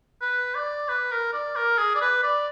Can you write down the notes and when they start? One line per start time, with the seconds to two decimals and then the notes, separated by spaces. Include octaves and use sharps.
0.21 B4
0.55 D5
0.89 B4
1.11 A#4
1.33 D5
1.56 A#4
1.78 G#4
1.95 D5
2.01 B4
2.23 D5